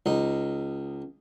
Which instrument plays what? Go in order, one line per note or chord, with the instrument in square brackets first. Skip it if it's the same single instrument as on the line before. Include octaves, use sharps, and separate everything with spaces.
[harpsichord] C#2 D#4